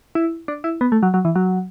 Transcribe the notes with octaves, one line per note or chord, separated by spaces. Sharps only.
E4
D4
E4
B3
A3
F#3
F#3
E3
F#3